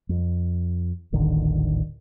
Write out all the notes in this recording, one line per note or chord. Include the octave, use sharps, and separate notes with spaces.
F2
D#1 A1 D3 D#3